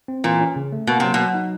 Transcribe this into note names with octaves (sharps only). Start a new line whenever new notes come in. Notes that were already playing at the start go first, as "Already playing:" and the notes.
C4
A#2 E3
C#4
C#3
A3
B2 A#3
C3 F#3
B2
F#3
D#4